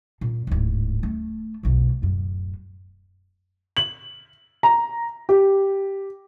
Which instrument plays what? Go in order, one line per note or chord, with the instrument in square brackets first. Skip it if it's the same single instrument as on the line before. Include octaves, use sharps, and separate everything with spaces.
[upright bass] A#2
D1 G#2
A3
F1 B1
D1 F#2
[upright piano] F#7
A#5
G4